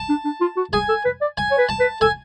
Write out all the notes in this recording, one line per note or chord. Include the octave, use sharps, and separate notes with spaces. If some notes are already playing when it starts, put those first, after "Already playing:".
Already playing: A5
D4
D4
F4
F#4
G#4 G#5
A4
B4
D5
G#5
C#5
B4
A5
B4
A4 G#5